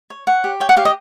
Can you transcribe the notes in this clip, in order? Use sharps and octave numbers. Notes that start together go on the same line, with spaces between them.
C#5
C#5 F#5
G4
C#5 G5
F#5
G4 F5
D#5